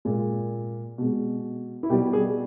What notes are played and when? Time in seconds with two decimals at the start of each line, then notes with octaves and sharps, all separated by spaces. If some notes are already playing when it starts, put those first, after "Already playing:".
0.05 A#2 G#3
0.98 B2 G#3
1.83 E4
1.89 B2 G3 G4
2.13 G#4